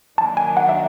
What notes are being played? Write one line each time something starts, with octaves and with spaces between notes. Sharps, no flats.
D#3 F#3 A#3 D4 A5
G#5
F#5
E5